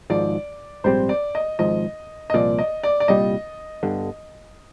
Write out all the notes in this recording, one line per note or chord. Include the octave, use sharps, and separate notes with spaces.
G#1 G#2 F3 D5
A#1 G#2 G3 C4 C5
D5
D#5
G#1 G#2 F3 D#5
D#5
C2 A#2 F3 D5
D#5
D5
D5
C2 A#2 G3 D#5
G1 G2 D3